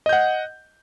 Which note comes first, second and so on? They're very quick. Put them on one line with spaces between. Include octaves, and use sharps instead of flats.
D#5 G6 F#5